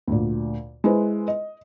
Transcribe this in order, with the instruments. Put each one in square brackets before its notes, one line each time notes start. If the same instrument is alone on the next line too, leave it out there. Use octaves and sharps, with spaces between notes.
[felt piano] D2 A#2
G#3 E4 B4 C5
D#5